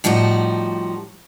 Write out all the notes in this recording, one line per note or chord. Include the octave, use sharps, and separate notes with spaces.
A2 F3 G3 D#4 F#4